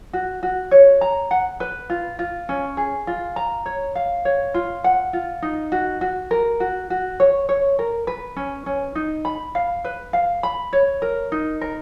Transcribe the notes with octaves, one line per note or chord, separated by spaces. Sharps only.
F#4
F#4
C#5
A#5
F#5
B4
F4
F4
C#4
G#4
F4
A#5
C#5
F5
C#5
F4
F#5
F4
D#4
F#4
F#4
A#4
F#4
F#4
C#5
C#5
A#4
B4
C#4
C#4
D#4
B5
F5
B4
F5
B5
C#5
A#4
D#4
A#4